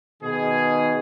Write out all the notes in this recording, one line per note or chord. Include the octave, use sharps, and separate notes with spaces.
B2 D#3 G#4